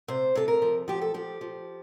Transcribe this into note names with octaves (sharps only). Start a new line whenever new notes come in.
C3 C5
C3 A4
A#4
F3
F3 G4
A4
F3 G4
F3